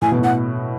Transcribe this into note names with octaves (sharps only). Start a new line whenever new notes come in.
A2 G#5
B2
A2
F#5